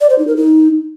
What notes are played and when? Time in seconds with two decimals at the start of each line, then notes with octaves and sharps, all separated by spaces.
0.01 D5
0.10 C5
0.19 D#4
0.27 A#4
0.36 D#4